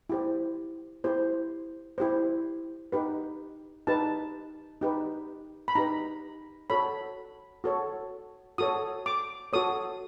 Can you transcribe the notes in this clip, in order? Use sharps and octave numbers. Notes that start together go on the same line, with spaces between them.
E4 G4 C5
E4 G4 C5
E4 G4 C5
D#4 G4 B4
D#4 G4 B4 A5
D#4 G4 B4
B5
D#4 G4 B4 A#5
F#4 A4 C#5 B5
F#4 A4 C#5
F#4 A4 C#5 D#6
D6
F#4 A4 C#5 D#6